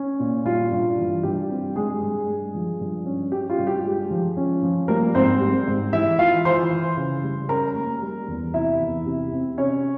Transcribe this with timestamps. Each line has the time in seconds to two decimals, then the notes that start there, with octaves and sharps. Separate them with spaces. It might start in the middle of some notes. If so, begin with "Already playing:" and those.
Already playing: C#4
0.20 A#2
0.45 G3 F4
0.71 G2
0.98 E3
1.23 G2 G4
1.50 C4
1.76 G2 G#3 G#4
2.02 G2
2.28 G#3
2.55 F3
2.80 G2
3.06 C#4
3.32 C#4 G4
3.50 F4
3.59 G2
3.67 G4
3.85 G#3
4.10 F3
4.37 C#4
4.63 F3
4.88 G3 A#3 A#4
5.15 G#2 C4 C5
5.41 G3
5.67 G#2
5.93 E3 E4 E5
6.19 E3 F4 F5
6.45 E3 C5 C6
6.71 E3
6.97 C#3
7.23 G3
7.49 C#4 A#4 A#5
7.75 A#3
8.02 G3
8.28 E2
8.54 C3 E4 E5
8.79 E2
9.06 C3
9.32 C4
9.58 C3 C#4 C#5